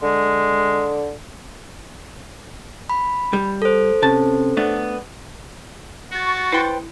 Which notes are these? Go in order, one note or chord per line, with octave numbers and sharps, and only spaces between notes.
D3 G#3
B5
G3
A4 C5
C3 C#4 A5
A3 B3 D4
F#4 C#6 A6
E4 B4 C5 G5